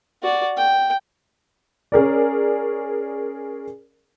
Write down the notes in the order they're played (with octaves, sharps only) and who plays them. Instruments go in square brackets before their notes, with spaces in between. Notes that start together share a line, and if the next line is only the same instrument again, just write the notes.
[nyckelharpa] F#4 D5
G5
[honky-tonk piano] C#4 G#4 A#4 D5